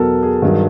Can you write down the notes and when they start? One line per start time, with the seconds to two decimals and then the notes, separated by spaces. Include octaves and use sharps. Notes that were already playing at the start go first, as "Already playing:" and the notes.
Already playing: E2 B2 F#3 A4 A#4
0.23 G#4
0.42 G2 D#3 F#3